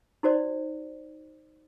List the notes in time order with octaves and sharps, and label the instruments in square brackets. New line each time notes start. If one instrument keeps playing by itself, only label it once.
[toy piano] D#4 F#4 C5 D5